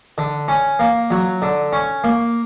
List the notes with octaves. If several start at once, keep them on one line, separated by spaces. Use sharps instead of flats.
D3
C#4
A#3
F#3
D3
C#4
A#3